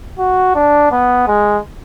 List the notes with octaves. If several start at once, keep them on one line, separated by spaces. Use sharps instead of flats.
F#4
D4
B3
G#3